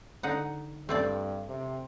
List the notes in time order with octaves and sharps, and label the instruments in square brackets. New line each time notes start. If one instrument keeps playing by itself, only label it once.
[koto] D3 D#4 F#5
[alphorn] G2 [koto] A3 C4 D5
[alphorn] C3